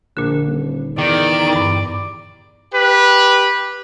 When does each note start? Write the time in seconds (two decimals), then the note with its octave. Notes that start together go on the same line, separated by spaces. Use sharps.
0.17 A#1 A#2 D3
0.46 D#1
0.98 E2 D#3 D5 D6
1.56 G2
2.72 G4 B4